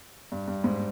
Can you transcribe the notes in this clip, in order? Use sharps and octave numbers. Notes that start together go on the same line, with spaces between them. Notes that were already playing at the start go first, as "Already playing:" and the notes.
G2
G2
G#2